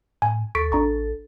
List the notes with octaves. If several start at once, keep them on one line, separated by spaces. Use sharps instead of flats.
A2 G#5
D#2 A4 C#6 B6 D7
A1 D4 A#5 C#6